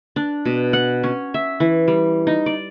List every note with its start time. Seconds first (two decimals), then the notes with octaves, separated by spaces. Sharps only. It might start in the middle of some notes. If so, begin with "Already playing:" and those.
0.16 D4
0.45 B2
0.73 F#5
1.04 C#4
1.34 E5
1.60 E3
1.88 G3
2.27 D#4
2.46 D5